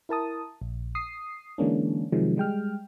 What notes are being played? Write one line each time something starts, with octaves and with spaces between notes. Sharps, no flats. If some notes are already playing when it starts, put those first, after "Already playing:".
E4 A#4 A5 D#6
A#1
D#6 C7
D3 E3 G#3 A#3 C#4 D4
C3 D#3 F3 F#3 G#3
G3 G#3 G5 F6